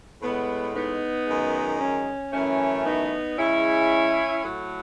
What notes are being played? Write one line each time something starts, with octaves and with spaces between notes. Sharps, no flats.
A2 G#3 B3
B3 D#4
F#2 D#3 G#3
C#4
F#2 E3 A3 C#4
B3 D#4
C#3 G#3 C#4 E4
A2 F#3 A3